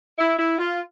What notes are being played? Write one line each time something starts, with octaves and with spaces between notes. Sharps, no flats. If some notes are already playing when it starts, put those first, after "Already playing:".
E4
E4
F4